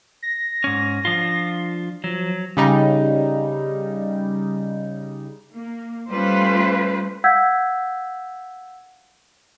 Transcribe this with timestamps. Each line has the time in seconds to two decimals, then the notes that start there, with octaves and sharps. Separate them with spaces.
0.23 A#6
0.64 G#2 C#4
1.05 F3 D4 F4
2.04 F3 F#3
2.57 C#3 G3 D#4
5.53 A#3
6.11 G3 A3 C#4 F4 B4 C5
7.24 F5 F#5 E6 G6 G#6 B6